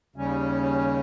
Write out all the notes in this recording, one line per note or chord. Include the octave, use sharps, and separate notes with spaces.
D#2 C#3 G3 C#4